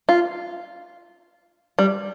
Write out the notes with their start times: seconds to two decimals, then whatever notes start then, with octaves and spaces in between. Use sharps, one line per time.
0.09 F4
1.79 G3